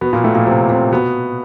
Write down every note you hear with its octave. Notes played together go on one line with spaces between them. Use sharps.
B2 B3
A#2 A#3
A2 A3
A#2 A#3
C3 C4
C3 C4
B2 B3